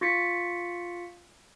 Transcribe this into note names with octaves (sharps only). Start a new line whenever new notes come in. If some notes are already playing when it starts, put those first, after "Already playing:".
F4 C#6 A6 B6 C#7